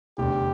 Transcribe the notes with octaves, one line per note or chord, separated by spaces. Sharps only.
F1 E2 D3 G4